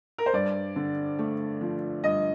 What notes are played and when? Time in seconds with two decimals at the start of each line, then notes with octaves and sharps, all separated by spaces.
0.18 A#4
0.26 C5
0.33 G2 D5
0.76 D3
1.19 A3
1.61 F3
2.04 G2 D#5